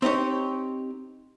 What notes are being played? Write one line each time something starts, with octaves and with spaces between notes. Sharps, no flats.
C4 D#4 G4 C#5